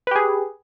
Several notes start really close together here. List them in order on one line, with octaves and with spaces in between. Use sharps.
B4 G4 G#4